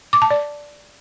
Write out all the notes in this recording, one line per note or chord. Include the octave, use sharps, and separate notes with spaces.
D6
A5
D5